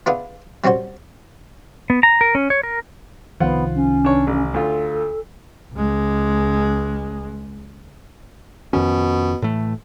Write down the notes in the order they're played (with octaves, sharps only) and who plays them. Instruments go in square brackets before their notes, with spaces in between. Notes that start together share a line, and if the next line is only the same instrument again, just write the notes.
[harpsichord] B3 D4 E4 F4 G#4 B4
G3 C4 C#4 F#4 C5
[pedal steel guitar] B3
A#5
A#4
C#4
C#5
A#4
[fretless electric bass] C2 D#3 F3 [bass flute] B3 [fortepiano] F4 C5 F#5
[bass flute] C#4
[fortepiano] D4 C#5
A1
[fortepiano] D2 F4 [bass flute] A4
[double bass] C#2 G#3
[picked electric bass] F2 D#3 C#4 [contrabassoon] B2
[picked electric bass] A2 E3 A3